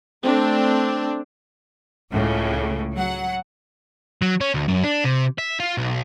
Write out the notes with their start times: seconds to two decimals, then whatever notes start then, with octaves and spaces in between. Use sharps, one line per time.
0.23 A3 C4 D4
2.11 C#2 A2 C#3
2.93 F#3 F#5
4.22 F#3
4.41 C#4
4.54 D2
4.68 F#2
4.84 D4
5.05 C3
5.39 E5
5.60 F4
5.78 B1